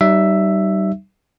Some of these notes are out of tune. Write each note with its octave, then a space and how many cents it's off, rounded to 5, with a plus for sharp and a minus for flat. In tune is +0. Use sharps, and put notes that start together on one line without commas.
G3 -30 D#4 -25 E5 +5